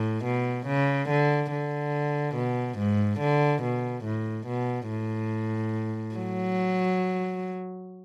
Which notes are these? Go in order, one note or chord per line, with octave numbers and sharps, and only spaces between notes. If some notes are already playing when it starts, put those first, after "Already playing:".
Already playing: A2
B2
C#3
D3
D3
B2
G#2
D3
B2
A2
B2
A2
F#3